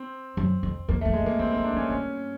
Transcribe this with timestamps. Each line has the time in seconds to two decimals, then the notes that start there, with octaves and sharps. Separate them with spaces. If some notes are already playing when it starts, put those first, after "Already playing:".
Already playing: C4
0.37 F#2
0.63 F2
0.88 F2 A#3
1.01 A3
1.05 F2
1.13 G#3
1.22 F2
1.26 A#3
1.39 E2 C4
1.52 C4
1.56 F2
1.64 D4
1.73 F2
1.77 C#4
1.90 G2 C#4